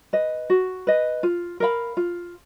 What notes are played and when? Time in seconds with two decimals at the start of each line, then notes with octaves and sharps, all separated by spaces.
0.13 B4 D#5
0.50 F#4
0.87 B4 D#5
1.23 F4
1.60 A#4 F5 B5
1.97 F4